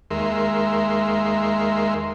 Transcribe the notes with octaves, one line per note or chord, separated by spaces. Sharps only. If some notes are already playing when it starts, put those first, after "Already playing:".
D#2 G#3 A#4 E5 C6